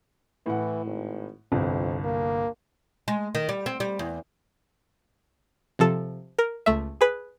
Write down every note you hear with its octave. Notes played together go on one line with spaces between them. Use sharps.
A2 E3 F#5
G#1
G1 C2 F2
A#3
G#3
D#3
G3
C4
G3
E2
C3 F3 A4
A#4
C#2 A3 E5
G#4 B4